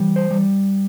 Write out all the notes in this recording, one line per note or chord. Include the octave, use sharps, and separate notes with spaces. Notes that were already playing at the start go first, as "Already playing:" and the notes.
Already playing: E3 G3
C5
G3